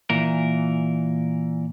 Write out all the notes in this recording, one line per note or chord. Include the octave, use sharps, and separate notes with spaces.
A#2 E3 A#4